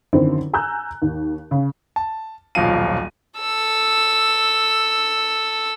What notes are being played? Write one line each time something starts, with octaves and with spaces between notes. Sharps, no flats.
F#2 D3 D#3 C4 E4
G#5 A#5 E6 F#6 G6
D#2
C#3
A5
D#1 B1 F3 F5 D#7
A4 E6